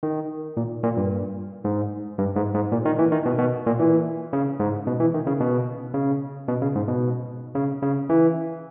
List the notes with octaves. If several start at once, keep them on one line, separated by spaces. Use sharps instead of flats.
D#3
A#2
A#2
G2
G#2
G2
G#2
G#2
A#2
D#3
E3
D#3
B2
B2
A#2
E3
C#3
G#2
B2
E3
D#3
C#3
B2
C#3
B2
C#3
G#2
B2
C#3
C#3
E3